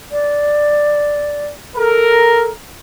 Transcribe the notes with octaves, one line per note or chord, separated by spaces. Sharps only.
D5
A4 A#4